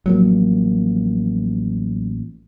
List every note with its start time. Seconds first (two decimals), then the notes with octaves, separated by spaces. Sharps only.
0.06 A1 F3 F#3 A#3